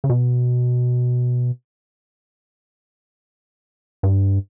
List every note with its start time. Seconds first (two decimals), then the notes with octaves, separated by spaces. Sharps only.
0.04 C#3
0.09 B2
4.03 G2